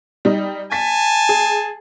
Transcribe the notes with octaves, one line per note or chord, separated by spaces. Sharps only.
G3 D#4
G#5 A5 A6 B6
G#4